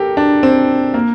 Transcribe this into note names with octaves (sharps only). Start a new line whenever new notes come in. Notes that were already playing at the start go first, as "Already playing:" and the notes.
Already playing: G4 A4 A#4
D4
C4
A#3